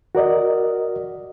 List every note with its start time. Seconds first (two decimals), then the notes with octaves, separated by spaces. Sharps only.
0.15 F#4 A#4 D5 D#5